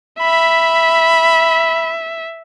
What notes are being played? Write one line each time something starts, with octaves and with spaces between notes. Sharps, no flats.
E5 B5